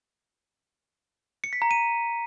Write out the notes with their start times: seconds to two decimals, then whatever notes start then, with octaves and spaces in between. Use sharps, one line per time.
1.44 C#7
1.53 B6
1.62 A#5
1.71 D#7